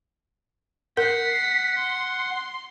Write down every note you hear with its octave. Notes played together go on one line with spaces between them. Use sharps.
A#4 F#5 B6 C7
C6